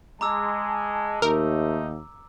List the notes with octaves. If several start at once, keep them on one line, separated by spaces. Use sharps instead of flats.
G#3 A5 A#5 D6 E6
D#2 A3 D#4 A#4 E5